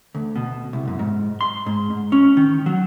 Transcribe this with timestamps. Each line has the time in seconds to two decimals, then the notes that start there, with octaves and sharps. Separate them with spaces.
0.15 D2
0.36 B2
0.73 C2
0.88 F#2
0.99 G#2
1.41 C6
1.66 G#2
1.90 G#2
2.12 C#4
2.37 D#3
2.66 F#3